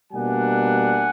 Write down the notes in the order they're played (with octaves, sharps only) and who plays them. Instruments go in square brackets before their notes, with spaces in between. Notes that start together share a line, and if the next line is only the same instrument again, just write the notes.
[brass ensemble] B2 G3 A#3 D4 F#5 G#5